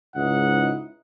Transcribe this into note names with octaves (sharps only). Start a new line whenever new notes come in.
C#2 G#2 D#4 E4 D#5 F#5